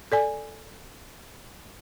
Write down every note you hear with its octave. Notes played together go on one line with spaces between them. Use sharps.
A4 D5 G#5